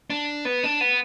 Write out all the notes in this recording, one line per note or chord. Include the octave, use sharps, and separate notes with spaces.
D4
B3
D4
B3